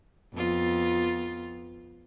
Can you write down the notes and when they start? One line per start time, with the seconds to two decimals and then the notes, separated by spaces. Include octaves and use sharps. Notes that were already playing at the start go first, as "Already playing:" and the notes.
0.34 F2 B3 F4